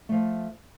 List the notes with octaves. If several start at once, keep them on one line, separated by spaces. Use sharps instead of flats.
F3 A3